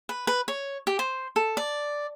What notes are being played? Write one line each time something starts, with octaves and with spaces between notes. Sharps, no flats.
B4
B4
C#5
G4
C5
A4
D5